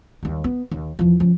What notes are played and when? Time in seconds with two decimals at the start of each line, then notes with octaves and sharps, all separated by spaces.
0.23 D#2 G3
0.44 B3
0.71 D#2
0.99 E2 F3
1.20 F3 C#4